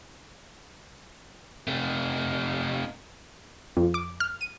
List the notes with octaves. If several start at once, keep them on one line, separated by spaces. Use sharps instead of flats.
C3 A3
F2
D6
F6
D#7